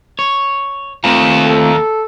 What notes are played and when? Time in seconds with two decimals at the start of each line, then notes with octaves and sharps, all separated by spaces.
0.19 C#5
1.04 D#2 A3 C4 F4
1.45 A4